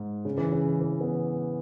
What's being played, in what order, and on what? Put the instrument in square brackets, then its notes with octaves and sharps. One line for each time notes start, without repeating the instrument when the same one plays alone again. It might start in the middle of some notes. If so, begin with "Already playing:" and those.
Already playing: [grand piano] G#2
C#3
E3
C#3
E3
B3